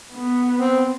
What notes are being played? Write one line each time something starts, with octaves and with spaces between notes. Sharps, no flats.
B3
C4